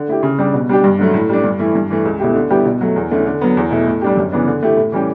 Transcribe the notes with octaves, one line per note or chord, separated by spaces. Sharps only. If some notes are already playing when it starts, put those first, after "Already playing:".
Already playing: D3
A3 E4 G4
C#3
G3 D4 G4
B2
G3 D4 G4
G2
D3 F#3 A3
A2
G3 D4
G2
E3 A3 E4
G2
E3 A3
C#2
B2 A3 E4 G4
D3
G3 B3 E4 G4
B2
F#3 A3
E2
D3 A3 C#4 E4
D3
F#3 B3
E2
B2 A3 E4
A2
G3 D4 G4
F#2
C#3 E3 B3 D4
D3
A3 E4 G4
A2
E3 G3 C#4 G4